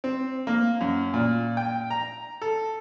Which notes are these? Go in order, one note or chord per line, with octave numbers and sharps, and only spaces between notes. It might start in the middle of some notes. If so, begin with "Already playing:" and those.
C4
A#3
F#2
A#2
G5
A#5
A4